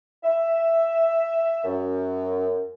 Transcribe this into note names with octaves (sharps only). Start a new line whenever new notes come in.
E5
F#2